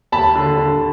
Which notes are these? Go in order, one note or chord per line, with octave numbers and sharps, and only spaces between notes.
D#2 A5 B5
D3
D3